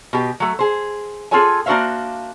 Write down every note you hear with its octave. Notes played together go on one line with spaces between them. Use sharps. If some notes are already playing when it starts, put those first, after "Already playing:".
B2 G4
F#3 A3
G#4 C5
C4 F4 G#4 A4 C#5 G#5
A#3 D4 F#4 C5 E5 F5